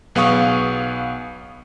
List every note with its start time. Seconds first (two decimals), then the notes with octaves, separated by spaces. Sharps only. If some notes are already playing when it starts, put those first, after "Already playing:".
0.15 B1 B3 G#4 F5 C#6 D#6